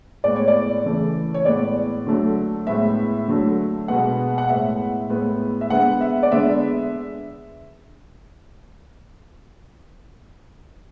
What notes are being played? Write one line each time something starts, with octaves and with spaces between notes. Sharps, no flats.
A2 G#3 B3 D5
C#5
D5
C#3 E3 A3
C#5
A2 G#3 B3 D5
D3 F#3 A3
A2 G#3 B3 E5
D3 F#3 A3
B2 G#3 B3 F#5
F#5
A2 G#3 B3 E5
A2 G#3 B3
E5
D3 G#3 B3 F#5
E5
D5
D3 G#3 B3 E5